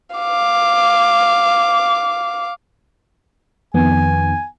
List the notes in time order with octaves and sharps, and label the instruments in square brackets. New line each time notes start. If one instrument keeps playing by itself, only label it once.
[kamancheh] F5 D6
[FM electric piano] F2 D#3 B3 [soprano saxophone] G#5